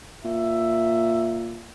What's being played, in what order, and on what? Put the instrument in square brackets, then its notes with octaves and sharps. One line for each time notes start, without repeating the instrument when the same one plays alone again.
[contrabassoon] A#2 [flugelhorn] E5